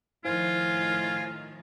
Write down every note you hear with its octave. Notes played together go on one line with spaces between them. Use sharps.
A2 D#3 F3 E4 F4 C5 F5 G#5